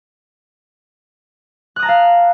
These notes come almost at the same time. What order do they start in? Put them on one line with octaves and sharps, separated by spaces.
F#6 D#6 A#5 A5 F5